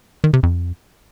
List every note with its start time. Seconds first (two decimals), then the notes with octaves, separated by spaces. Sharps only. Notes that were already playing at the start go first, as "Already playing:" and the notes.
0.24 D#3
0.33 C3
0.43 F2